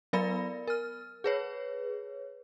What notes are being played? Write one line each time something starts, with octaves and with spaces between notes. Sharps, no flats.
F#3 B3 A#4 D5 B5 A#6
A#4 F6
G#4 B4 C#5